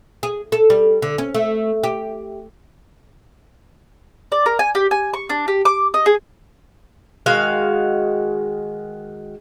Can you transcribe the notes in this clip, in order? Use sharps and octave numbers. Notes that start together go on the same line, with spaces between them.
G#4
A4
G3
D3
C#4
A3
G4
D5
A#4
G#5
G4
G#5
C#6
D4
G4
D6
D#5
G#4
D#3 G#3 F#4 F5